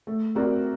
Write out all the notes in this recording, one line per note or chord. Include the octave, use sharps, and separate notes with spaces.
A3
C4 F#4 A#4 D5